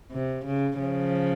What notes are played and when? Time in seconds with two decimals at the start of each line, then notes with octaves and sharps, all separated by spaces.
0.12 C3
0.45 C#3
0.79 C#3 F3